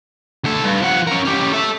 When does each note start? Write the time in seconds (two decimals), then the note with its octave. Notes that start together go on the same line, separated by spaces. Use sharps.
0.44 D2 A4
0.64 G2
0.82 F3 F#5
1.07 C#4 A#4
1.25 C#4 G4
1.53 A4 E5